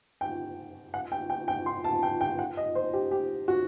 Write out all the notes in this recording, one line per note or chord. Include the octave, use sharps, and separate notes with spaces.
G5
F#5
G5
G5
G5
C6
A5
G5
G5
F#5
D#5
C5
G4
G4
F#4